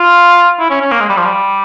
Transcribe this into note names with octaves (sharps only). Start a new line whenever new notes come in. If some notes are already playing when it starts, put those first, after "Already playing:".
Already playing: F4
E4
C#4
C#4
A#3
G#3
G3
F3
G3